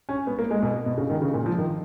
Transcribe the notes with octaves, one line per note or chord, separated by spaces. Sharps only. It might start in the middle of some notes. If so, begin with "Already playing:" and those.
C#4
B3
A#3
G#3
B2
B2
C#3
D#3
C#3
A#2
F3
D#3